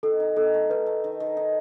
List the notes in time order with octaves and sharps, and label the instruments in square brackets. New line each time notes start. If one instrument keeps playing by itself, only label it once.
[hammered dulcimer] D#3 [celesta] A4
[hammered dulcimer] D#4
[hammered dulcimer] D#3 [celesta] A4
[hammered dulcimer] A3
[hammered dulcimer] D#3 [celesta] B4
[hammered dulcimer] A3
D#3
D#3
D#4